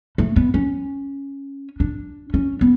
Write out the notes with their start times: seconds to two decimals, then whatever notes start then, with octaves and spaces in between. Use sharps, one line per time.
0.18 A3
0.36 B3
0.54 C#4
1.80 D4
2.34 C#4
2.61 B3